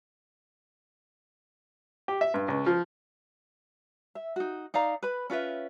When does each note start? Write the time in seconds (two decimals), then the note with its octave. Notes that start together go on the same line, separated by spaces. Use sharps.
2.08 G4
2.21 E5
2.34 G2
2.48 C#2
2.66 F3
4.15 E5
4.36 D#4 F#4
4.74 D#4 D5 F5 A#5
5.03 B4 B5
5.30 C#4 F4 B4 E5